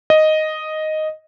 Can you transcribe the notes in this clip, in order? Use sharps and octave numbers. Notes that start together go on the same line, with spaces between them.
D#5